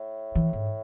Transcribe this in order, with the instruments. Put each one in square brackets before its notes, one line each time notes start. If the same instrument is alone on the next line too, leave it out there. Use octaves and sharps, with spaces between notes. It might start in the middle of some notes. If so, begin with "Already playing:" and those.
Already playing: [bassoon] A2
[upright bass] E3
G#2